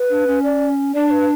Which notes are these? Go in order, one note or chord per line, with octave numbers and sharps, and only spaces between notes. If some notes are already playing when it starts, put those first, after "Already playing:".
Already playing: B4
D4
C#4
D5
D4 D5
B4